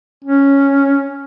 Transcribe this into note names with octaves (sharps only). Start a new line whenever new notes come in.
C#4